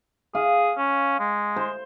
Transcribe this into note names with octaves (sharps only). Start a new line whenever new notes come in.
G#4 F5
C#4
G#3
C5